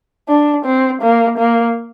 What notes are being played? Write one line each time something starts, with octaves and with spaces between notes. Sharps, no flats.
D4
C4
A#3
A#3